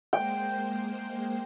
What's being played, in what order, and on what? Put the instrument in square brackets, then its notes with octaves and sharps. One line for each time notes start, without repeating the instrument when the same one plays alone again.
[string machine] G#3 A#3 C5 [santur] G5